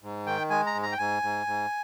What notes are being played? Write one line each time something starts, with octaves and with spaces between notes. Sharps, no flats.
G#2
D#3 G5
G#3 G#5
A#5
G#2
A#5
G5
G#2 G#5
G#2
G#2